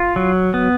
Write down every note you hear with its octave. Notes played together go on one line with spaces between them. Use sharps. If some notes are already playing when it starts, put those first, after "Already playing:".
Already playing: F4
F#3
B3